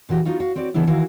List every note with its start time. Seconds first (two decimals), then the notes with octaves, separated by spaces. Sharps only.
0.09 A#2 E3 F#4 G4
0.25 B3 D#4 F4 F#4
0.40 F#4 F5
0.56 C4 F#4 B4 D5
0.74 C#3 E3 B3 D4 E4
0.87 D#3 E3 E4 F#4 A#4 F5